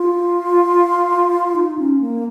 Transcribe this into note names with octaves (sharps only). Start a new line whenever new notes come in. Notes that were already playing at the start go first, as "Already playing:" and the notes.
Already playing: F4
D#4
C#4
A#3